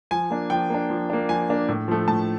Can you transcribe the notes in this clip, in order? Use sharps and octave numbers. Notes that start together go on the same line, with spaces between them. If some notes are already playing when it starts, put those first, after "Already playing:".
F3 G#5
A#3 D4
F3 G5
A#3 D4
F3
A#3 D4
F3 G#5
A#3 D4
A2
F3 A3
A2 A5